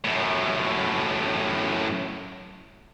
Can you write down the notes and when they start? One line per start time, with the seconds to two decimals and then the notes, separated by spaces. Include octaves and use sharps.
0.04 F#2 A2